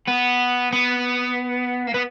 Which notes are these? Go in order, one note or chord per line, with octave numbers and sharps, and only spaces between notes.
B3
B3
A#3
B3